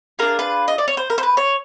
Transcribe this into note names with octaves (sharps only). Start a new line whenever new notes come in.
D4 F4 G#4 A#4
B4
D#5
D5
C#5
C5
A#4
C5
B4
C#5